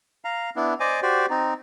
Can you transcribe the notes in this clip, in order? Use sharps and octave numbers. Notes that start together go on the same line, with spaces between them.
F5 A#5
B3 D4 E4
C5 D5 D#5 G#5 D6
F#4 G4 C5 D5
C4 D#4